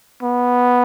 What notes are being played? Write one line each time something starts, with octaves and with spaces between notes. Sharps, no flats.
B3